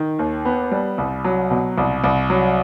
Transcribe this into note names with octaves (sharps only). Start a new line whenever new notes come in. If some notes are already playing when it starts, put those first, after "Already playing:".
Already playing: D#3
D#2
B3
G3
C2
F#3
B2
C2
C2
F#3